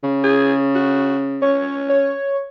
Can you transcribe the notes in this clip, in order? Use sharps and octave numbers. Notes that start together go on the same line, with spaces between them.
C#3
G#4
F#4
C#4 C#5
C#5